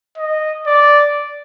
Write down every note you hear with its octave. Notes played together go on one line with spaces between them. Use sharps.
D#5
D5